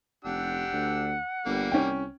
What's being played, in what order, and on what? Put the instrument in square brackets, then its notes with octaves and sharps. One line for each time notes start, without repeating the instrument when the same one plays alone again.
[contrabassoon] F1 [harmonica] D4 G4 E6 [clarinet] F#5
[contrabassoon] D2
[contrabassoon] G1 [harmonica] G3 A#3
[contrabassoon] C2 [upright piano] C#4 G5